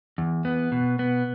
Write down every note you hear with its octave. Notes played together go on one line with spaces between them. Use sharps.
E2
B3
B2
B3